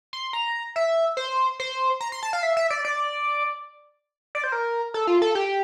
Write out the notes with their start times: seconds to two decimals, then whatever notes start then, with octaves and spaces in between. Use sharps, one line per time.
0.13 C6
0.33 A#5
0.76 E5
1.17 C5
1.60 C5
2.01 A#5
2.12 C6
2.23 A5
2.33 F5
2.43 E5
2.57 E5
2.70 D5
2.85 D5
4.35 D5
4.44 C5
4.52 A#4
4.94 A4
5.07 F4
5.22 A4
5.35 G4